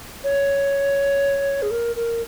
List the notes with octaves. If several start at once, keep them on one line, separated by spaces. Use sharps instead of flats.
C#5
G#4
A#4
A#4